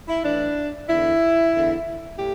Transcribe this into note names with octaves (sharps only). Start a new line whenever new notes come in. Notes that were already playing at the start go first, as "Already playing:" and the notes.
E4
A2 E3 D4
E2 D3 E4
E2 D3
A2 G4